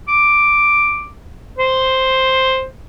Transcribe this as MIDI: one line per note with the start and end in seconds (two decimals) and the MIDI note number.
0.08 1.08 86
1.58 2.65 72